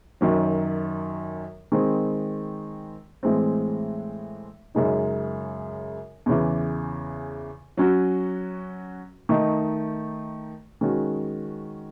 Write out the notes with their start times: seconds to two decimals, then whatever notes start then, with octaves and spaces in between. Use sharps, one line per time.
0.21 F#2 D#3 F#3
1.72 D#3 G#3 C4
3.23 A2 E3 G#3 C4
4.75 F#2 C#3 G#3 D#4
6.26 E2 C#3 E3
7.77 F#3 C#4 F#4
9.29 D#3 A3 D#4
10.81 D#3 G#3 C#4 F#4